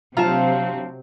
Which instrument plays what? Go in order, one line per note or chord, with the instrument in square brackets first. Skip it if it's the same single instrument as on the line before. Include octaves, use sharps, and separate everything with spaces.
[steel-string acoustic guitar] D2 F5 A#5 [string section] C3 F#3 C4 [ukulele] F4 A5